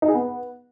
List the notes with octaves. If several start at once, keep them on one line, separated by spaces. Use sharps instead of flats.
D#4
G#4
B3